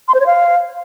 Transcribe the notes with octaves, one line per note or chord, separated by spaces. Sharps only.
C6
C5
C#5
F5